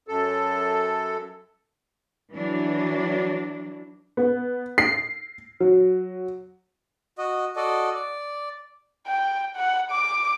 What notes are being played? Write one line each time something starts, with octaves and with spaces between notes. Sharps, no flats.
F#2 A4
E3 F#3 D4
B3
C7
F#3
F#4 D#5
F#4 A4 D5 D#5
D5
G5
F#5
D6